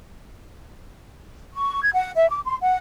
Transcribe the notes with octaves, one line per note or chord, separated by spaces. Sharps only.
C#6
G#6
F#5
E5
D6
C6
F#5